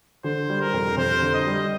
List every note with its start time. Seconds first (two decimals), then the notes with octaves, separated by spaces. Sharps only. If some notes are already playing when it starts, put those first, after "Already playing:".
0.24 D3 C5
0.49 G3
0.61 A#4
0.74 F2
0.97 F2 C5
1.22 D3
1.34 D#5
1.47 G3